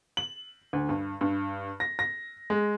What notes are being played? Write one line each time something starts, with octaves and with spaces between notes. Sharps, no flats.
F#7
D2
G2
G2
A#6
A#6
G#3